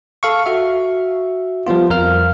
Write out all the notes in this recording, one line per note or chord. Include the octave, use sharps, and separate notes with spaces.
A4 F5 C#6
F#4 E5
F3 G3 B3 F4
F2 A#4 F5 F6